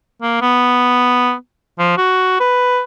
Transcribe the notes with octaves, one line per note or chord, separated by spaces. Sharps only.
A#3
B3
F3
F#4
B4